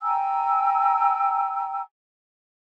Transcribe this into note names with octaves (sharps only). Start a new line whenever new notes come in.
G5 G#5 A#5 E6